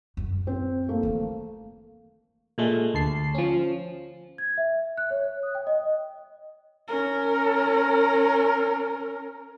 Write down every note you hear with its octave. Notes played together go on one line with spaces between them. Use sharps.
F#2 A2
C4
A3 A#3
D#3 E3
A#2 G#3 A3
D2 A5 C7
F3 C#4
G#6
E5
F#6
C#5
D#6
G5
D#5
C#4 A#4